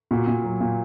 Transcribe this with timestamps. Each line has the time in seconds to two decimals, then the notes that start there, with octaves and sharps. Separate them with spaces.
0.11 A#2 F#4
0.27 A#2
0.44 F#3
0.61 A#2